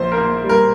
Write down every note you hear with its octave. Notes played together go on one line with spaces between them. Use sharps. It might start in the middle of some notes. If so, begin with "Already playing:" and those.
Already playing: A#1 C5
A#4
A#3
G3
A#4